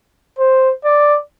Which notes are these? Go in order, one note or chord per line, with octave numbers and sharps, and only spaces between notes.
C5
D5